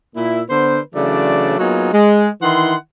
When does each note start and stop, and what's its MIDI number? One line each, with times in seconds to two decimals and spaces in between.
0.15 0.41 46
0.15 0.41 64
0.49 0.79 50
0.49 0.79 59
0.49 0.79 71
0.49 0.79 72
0.94 1.55 49
0.94 1.55 52
0.94 1.55 54
0.94 1.55 57
0.94 1.55 62
0.94 1.55 74
1.59 1.92 54
1.59 1.92 58
1.59 1.92 59
1.59 1.92 63
1.59 1.92 65
1.59 1.92 68
1.92 2.28 56
2.42 2.74 51
2.42 2.74 52
2.42 2.74 64
2.42 2.74 78
2.42 2.74 84